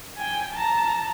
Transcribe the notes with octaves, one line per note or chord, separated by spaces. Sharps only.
G5 G#5
A5 A#5